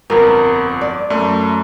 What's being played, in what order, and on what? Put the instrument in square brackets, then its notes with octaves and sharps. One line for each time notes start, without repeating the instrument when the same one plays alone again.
[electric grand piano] G1 F2 [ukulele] A#4 B4
[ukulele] D5
[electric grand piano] F#2 A3